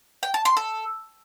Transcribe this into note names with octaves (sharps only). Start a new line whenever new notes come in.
G5
A5
C6
A4